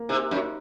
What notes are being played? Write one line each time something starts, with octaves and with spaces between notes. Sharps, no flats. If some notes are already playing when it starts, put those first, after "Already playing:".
Already playing: A#3
C3 D#4
F#2 D#4